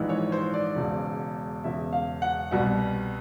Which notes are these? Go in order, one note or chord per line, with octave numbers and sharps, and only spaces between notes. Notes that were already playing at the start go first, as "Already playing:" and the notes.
Already playing: A#1 G#2 E3
C#5
C5
D5
E1 E2 C#3
E1 E2 C#3 E5
F5
F#5
C2 B2 G3 F#5